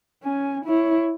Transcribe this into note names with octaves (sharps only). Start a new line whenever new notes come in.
C#4 G#5
E4 C#5